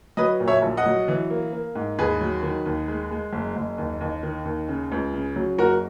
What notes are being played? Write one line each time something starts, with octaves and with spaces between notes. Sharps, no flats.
F#3 B4 D#5
A#2
C#5 E5
A#1
D#5 F#5
F#3
E3
A#3
A#3
G#2
D#2 G#4 B4
F#3
D#3
D#2
G#3
G#3
F#1
F#1
D#2
D#2
D#3
D#2
C#3
C#2
C#3
F#3
F#1 F#4 A#4